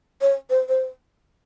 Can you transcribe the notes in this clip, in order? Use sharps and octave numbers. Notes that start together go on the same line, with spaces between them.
C#5
C5
C5